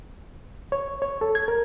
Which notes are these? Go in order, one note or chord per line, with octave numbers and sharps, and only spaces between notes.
C#5
C#5
A4
G#6
A#4